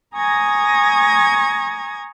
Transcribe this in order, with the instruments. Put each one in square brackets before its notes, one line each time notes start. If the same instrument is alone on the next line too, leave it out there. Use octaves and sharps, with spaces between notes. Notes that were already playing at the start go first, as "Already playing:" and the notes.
[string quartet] G#5 A#5 C#6 D#6 G#6 A#6